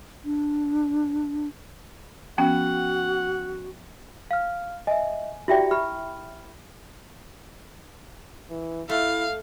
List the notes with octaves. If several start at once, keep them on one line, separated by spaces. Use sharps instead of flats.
D4
F3 B3 C#4 F#4 F#5 G5
F5 F6
D#5 E5 G#5
E4 F#4 G4 D5 E5 G5
G4 B5 F6
E3
A3 E4 F5